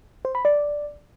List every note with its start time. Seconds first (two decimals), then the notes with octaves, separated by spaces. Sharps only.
0.25 C5
0.35 B5
0.45 D5